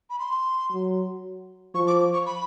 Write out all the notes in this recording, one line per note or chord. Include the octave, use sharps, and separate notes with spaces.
B5
C6
F#3
F3 C#6
D6
C#6
B5